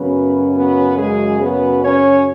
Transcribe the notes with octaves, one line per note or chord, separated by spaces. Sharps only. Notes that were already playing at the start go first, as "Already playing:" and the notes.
Already playing: F#2 C#3 F#3 B3 C#4 B4
B3 B4
G#3 G#4
B3 B4
C#4 C#5